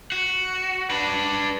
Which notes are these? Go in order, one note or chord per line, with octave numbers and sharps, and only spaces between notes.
F#4
D4 B4